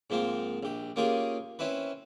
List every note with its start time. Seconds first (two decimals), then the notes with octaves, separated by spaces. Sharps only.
0.10 G#2 F3 A#3 C4
0.63 A#1 G4
0.96 A#3 C#4 F4 G4 G#4
1.59 C4 C#4 E4 B4